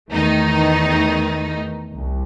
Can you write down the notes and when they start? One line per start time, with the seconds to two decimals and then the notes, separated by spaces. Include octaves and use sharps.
0.12 E2 D#3 A3 D#4
1.95 C2